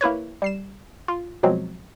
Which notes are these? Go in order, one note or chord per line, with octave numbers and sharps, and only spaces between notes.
A#3 E4 B4 C#5
G3 C7 E7
F4
B2 F3 F#3 G#3 C4